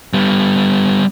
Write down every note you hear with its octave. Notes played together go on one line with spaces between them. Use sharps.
G3 B3